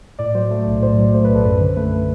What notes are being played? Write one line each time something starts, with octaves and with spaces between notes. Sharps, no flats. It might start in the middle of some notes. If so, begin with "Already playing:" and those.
A2 D5
F#3 C5
A3
B1
A2 C5
F#3
A3 C5
B4
B1
A4
F#2 B4
D3
A3 B4